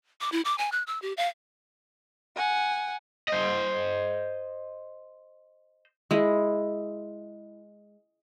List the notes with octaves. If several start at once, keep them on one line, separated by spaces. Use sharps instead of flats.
D6
E4
D6
G#5
F#6
E6
G4
F5
F#5 G#5
C5 D#5
G#3 E4